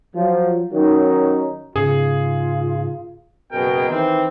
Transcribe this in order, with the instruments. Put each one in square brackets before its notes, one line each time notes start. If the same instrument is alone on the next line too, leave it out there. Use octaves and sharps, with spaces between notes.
[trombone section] F3 F#3
D#3 F#3 C#4 D#4
[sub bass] G#2 [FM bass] C#3 [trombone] F4 [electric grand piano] G#4
[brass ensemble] F#1 B2 G#4 A#4 G5
D#3 E3 C4